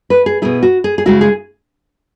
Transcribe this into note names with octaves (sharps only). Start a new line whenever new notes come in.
B4
G#4
B2 B3 E4 G#4
F#4
G#4
G#4
C#3 G#3 E4 F#4
G#4